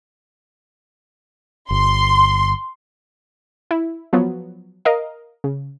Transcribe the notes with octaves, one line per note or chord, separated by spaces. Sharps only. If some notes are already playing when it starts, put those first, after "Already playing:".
G1 C6
E4
F3 F#3 B3
A#4 D#5 F5
C#3